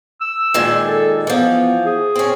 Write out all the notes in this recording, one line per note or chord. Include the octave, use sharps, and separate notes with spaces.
E6
A#2 D#3 G#3
A4
E3 F3 B3
G#4
C4 C#4